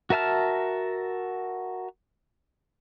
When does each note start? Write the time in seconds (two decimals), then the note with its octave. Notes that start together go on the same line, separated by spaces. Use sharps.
0.10 F#4 A#4 E5 A5 F6